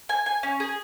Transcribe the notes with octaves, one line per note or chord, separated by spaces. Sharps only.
G#5
G#5
C#4
G#4